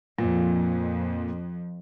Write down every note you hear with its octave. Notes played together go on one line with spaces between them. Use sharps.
F2 A#2